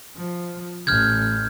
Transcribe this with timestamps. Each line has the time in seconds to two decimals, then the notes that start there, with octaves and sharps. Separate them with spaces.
0.15 F3
0.87 A1 F6 G6 G#6